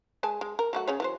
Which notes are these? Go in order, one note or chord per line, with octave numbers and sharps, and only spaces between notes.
G#3 G#5 A5
G#3
A#4
F#3 A3 F#4
C#3 G#4 C#5
E3 F#3 C5